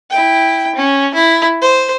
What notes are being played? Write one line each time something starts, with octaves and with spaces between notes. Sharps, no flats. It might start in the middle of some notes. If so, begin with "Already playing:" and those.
E4 G5
C#4
E4
C5